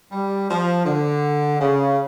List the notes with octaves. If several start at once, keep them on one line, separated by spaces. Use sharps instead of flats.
G3
F3
D3
C#3